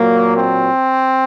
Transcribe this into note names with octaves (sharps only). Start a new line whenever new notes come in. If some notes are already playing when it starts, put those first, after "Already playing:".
Already playing: A#2 F#3 A#3
C4